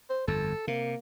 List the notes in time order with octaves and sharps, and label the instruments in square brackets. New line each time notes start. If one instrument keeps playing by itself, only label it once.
[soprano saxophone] C5
[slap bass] G1 F2 [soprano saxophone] A4
[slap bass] C3 [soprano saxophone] A#3